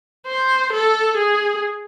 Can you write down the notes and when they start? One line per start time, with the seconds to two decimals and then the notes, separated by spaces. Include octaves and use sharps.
0.27 C5
0.73 A4
1.17 G#4